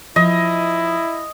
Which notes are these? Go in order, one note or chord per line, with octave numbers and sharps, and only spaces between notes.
F3 E4 D#5